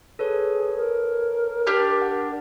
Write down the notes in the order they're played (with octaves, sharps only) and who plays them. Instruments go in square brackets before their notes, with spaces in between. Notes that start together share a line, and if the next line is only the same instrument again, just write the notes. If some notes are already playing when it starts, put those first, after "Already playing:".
[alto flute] G#4 [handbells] A4 B4 C#5
[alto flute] A#4
[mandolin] D4 G4 F6
[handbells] F#5